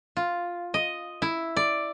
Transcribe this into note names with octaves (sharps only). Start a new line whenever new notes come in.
F4
D#5
E4
D5